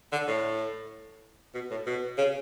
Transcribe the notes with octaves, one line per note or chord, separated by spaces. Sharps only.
D3
A2
B2
A2
B2
C#3